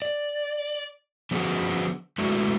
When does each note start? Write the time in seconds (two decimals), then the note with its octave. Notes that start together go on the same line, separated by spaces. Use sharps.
0.02 D5
1.31 D3 F3 B3 C#4 F#4 G#4
2.18 G#3 A3 B3 D4 E4 F#4